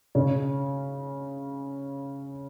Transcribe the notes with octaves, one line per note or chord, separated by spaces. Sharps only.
C#3 C#4